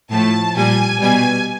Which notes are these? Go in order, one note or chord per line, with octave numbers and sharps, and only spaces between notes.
A2 F3 A3 A5
A#2 G3 G#5
B2 G3 G#5